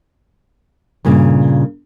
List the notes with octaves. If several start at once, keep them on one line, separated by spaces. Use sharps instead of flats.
G2 A#2 C#3 A#3